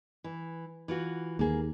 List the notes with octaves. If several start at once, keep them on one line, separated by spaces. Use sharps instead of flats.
E3
E3 F4 F#4
D#2 A#3 G#4